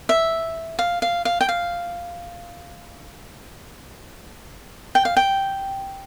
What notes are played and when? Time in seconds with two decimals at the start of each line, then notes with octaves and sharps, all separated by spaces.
0.09 E5
0.79 F5
1.02 F5
1.25 F5
1.41 G5
1.49 F5
4.95 G5
5.05 F5
5.17 G5